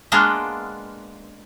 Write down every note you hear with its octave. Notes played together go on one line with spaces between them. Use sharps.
G#3 A#3 B3 D4 F4